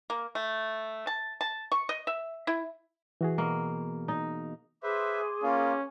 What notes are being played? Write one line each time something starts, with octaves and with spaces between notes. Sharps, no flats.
A#3
A3
A5
A5
C#6
D#5
E5
E4
E3 F#4 G#4
B2 A#3
D#4
G#4 B4 C5 E5 C6 D6
A#3 C#4 F4